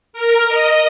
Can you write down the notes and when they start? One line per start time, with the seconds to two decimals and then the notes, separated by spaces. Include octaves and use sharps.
0.13 A#4
0.48 D#5